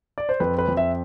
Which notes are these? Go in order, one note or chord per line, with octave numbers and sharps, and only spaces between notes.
D5
C5
F2 B4
B4
F2
E5